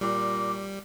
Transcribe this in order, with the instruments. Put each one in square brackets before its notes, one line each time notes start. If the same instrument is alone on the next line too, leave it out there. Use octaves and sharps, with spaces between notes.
[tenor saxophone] A#2 [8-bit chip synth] G3 [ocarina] D6